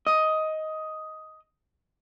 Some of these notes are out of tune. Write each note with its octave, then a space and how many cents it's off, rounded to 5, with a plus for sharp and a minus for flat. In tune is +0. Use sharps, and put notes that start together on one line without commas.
D#5 +10